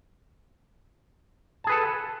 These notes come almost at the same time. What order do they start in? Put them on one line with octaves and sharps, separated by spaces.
A5 G#4 B4 A4